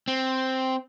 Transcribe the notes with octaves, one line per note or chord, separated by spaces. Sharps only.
C4